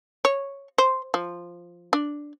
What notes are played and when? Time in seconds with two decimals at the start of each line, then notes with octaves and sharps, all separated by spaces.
0.25 C#5
0.78 C5
1.14 F3
1.93 D4